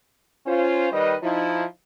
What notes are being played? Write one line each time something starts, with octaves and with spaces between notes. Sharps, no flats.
C#4 F4 C5
D#3 G3 B4 D#5
F3 D#4 E4